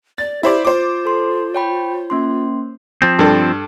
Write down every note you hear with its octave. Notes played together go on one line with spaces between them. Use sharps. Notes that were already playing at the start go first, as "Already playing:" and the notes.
D5 A6
E4 G4 C5 D5
F4 C5 D6
A4 C6
C#5 G5 B5
A#3 C#4 C6
F3 C4
G2 A4